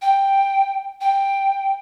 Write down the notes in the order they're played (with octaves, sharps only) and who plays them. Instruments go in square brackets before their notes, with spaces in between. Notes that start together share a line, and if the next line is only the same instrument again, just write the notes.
[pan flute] G5
G5